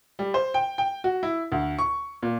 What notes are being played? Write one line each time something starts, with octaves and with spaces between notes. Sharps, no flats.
G3
C5
G5
G5
F#4
E4
D2
C#6
A#2